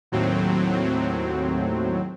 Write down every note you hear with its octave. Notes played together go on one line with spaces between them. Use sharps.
D#2 A2 F#3 C4